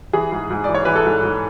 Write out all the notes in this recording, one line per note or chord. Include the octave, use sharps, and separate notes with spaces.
E3 G#4
G#2
G#2
E3 D5
C#5
E3 B4
A4
G#2
G#2